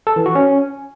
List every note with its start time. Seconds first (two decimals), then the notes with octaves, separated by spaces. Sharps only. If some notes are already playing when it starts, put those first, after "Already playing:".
0.07 A4
0.16 E3
0.26 F#4
0.35 C#4